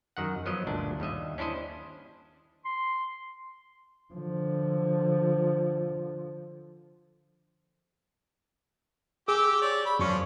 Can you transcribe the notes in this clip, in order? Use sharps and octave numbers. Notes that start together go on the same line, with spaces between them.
F#2 D#3 F#5
F3 F#3 B3 D#5
G1 D2 A#2 D4
D#2 G3 D#5 E5
C#4 D4 E4 C5 D#5
C6
D3 F3
G4 G#4 D6 E6
C#5 D5
B5
F#2 F3 F#3 C#4 D4 C#6